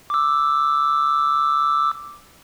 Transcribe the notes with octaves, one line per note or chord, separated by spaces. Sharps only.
D6 E6